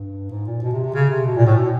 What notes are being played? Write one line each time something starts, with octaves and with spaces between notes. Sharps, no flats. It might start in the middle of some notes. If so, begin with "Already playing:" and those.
Already playing: G2
G#2
A#2
B2
C3
C3
C#3
C3
B2
A#2
A2
B2